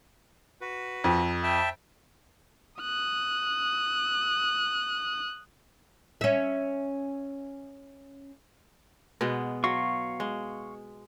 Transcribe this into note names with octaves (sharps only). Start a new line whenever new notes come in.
F#4 B4
F2
E5 G5 A5
D#6 F#6
C#4 E5
B2 G#3 B3
F#3 F5 C6 C#6
G#3